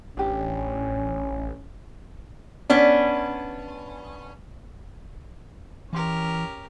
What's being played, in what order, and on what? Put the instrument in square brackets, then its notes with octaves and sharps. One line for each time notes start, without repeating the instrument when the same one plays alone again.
[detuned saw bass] A1 [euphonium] C#4 [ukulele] D4 G4
[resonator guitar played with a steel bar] B3 C#4 D4
[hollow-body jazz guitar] E3 C6 [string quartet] C#4 G4 A#4